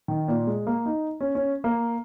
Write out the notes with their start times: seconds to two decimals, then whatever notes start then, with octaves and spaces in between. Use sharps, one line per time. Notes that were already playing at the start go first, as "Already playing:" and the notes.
0.08 D#3
0.28 A#2
0.47 G#3
0.67 A#3
0.86 D#4
1.21 C#4
1.35 C#4
1.64 A#3